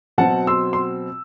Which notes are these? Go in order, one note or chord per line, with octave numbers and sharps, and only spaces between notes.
B2 F#3 C4 F#5 A5
C6 E6
C6